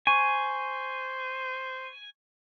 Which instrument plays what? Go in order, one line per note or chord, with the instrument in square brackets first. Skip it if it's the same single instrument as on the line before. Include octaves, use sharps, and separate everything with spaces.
[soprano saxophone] C5 [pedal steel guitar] G#5 [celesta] C#6